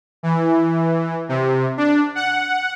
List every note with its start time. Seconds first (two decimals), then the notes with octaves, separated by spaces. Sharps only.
0.23 E3
1.29 C3
1.77 D4
2.15 F#5